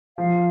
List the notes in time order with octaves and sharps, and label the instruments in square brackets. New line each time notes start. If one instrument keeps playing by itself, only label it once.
[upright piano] F3 [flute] F5